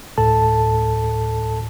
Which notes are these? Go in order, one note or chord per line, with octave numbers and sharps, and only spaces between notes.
D2 A2 A4 A5